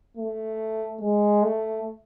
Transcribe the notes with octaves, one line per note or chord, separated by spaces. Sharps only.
A3
G#3
A3